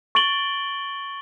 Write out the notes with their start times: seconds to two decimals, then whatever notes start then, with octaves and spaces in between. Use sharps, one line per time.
0.15 C#6 A6 D7 F#7 G7